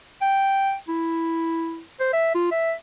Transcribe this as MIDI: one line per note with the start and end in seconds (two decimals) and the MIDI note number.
0.21 0.75 79
0.88 1.82 64
2.00 2.10 72
2.13 2.32 76
2.35 2.47 65
2.51 2.73 76